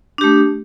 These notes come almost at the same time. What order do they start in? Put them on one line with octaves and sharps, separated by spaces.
D4 G4 A3